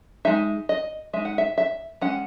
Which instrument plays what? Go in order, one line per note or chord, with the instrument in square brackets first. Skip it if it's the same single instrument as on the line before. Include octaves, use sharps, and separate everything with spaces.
[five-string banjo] G#3 D#4 E5
D#5
G#3 D#4 E5
F#5
E5
E5
G#3 C#4 F#5